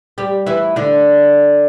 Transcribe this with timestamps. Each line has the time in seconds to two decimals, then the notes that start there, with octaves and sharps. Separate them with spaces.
0.18 G3 G4
0.46 E3 E4
0.76 D3 D4